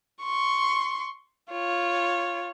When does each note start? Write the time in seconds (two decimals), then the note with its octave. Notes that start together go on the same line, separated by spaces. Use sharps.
0.23 C6 C#6
1.52 F4 C#5